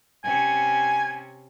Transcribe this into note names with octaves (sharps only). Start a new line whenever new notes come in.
C3 C#4 G#5